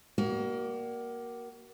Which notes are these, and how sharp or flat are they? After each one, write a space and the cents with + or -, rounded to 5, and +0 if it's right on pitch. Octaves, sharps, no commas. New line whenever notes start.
A#3 +15 F#4 +40 D5 +0